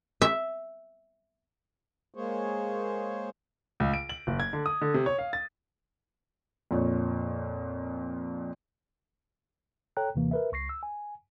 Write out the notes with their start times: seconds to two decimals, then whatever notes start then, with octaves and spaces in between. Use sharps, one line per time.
0.22 E5
2.14 G#3 A#3 G#4 C5 C#5
3.80 C#2
3.94 D7
4.09 F#7
4.27 F#1
4.40 G#6
4.53 D3
4.66 D#6
4.81 D3
4.94 C3
5.06 C#5
5.18 F5
5.33 A6
6.71 F2 A#2 C#5
9.97 A4 C#5 G5 A#5 F#6
10.15 D#2 C3 E3 A#3
10.31 A#4 B4 E5
10.52 C#2 C#6 A#6 C7
10.69 E6
10.83 G#5